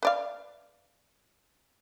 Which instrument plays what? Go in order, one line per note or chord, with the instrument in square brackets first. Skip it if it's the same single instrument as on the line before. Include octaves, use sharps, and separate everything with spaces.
[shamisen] B4 D5 F5